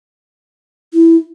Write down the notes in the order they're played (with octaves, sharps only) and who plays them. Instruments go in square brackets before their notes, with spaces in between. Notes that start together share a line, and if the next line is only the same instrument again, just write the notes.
[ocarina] E4